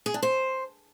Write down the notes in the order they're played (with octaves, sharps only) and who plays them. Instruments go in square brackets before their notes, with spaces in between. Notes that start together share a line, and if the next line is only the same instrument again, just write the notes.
[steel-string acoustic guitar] G#4
D4
C5